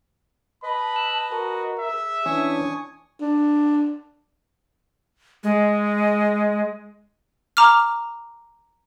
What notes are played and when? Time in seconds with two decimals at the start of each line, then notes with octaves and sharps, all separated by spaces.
0.63 B4 D#5 A5 B5
0.96 E6 F#6
1.32 F#4 A#4
1.79 G#4 E5
2.26 E3 C#4 D4 G#5 C#6 D#6
3.21 D4
5.44 G#3
7.57 A#5 D6 F6